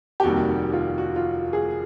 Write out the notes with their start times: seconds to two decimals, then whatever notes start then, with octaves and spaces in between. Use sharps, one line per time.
0.20 G4
0.23 F1 D#2 D#3 G3 F#4
0.73 F4
0.98 F#4
1.16 F4
1.53 G#4